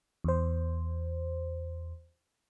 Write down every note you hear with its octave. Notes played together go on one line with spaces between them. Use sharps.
E2 C5